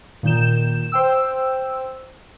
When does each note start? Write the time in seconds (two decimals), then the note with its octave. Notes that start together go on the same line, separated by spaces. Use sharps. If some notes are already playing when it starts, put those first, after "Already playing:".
0.23 A#2 D#3 G6 E7
0.92 C5 G5 E6